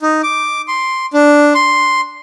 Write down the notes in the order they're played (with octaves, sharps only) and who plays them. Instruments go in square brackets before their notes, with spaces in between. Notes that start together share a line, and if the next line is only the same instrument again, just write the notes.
[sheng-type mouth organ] D#4
D6
C6
D4
C6